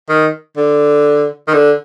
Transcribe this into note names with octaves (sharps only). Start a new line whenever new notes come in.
D#3
D3
D#3
D3